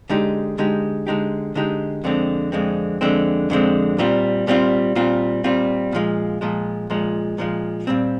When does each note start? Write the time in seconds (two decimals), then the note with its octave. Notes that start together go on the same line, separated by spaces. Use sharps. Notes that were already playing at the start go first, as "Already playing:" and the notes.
0.10 D3 G#3 D#4 G4
0.58 D3 G#3 D#4 G4
1.07 D3 G#3 D#4 G4
1.55 D3 G#3 D#4 G4
2.04 F2 D3 G#3 C4
2.52 F2 D3 G#3 C4
3.01 F2 D3 G#3 C4
3.50 F2 D3 G#3 C4
3.98 A#2 G3 C4 F4
4.47 A#2 G3 C4 F4
4.95 A#2 G3 C4 F4
5.44 A#2 G3 C4 F4
5.92 A#2 F3 G#3
6.41 A#2 F3 G#3
6.90 A#2 F3 G#3
7.38 A#2 F3 G#3
7.87 A#2 G3 C4